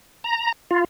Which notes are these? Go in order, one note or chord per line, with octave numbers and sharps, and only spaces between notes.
A#5
F4